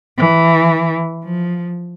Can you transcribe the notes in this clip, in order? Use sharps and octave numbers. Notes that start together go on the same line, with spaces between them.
E3
F3